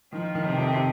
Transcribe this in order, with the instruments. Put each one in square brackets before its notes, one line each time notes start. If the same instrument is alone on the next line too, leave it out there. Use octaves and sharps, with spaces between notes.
[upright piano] D#3 [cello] F3
[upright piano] D#3
[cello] C3
[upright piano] F2